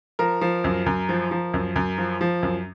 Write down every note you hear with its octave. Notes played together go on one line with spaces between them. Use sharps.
F3 A#4
F3
F#2
F#2
F3
F3
F#2
F#2
F3
F3
F#2